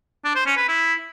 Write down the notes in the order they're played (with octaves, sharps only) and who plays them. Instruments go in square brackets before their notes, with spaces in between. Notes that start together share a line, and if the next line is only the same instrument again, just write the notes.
[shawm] D4
C5
C#4
B4
E4